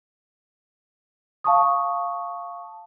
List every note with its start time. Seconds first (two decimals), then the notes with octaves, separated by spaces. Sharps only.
1.44 F5 A5 C#6 D#6